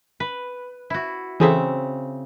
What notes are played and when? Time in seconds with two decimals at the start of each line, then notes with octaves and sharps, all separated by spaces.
0.20 B4
0.90 E4 F#4
1.40 C#3 E3 C4 G#4 A4 E5